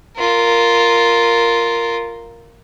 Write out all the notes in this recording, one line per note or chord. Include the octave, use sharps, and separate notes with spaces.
F4 A#4